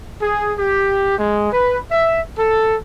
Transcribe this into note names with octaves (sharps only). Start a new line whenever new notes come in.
G#4
G4
G#3
B4
E5
A4